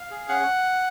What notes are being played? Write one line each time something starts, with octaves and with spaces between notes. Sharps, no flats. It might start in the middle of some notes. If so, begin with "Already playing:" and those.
Already playing: F5
G#4
C#4 F#5